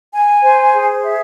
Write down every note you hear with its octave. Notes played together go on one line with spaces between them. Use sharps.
G#5
C5
G#4
E5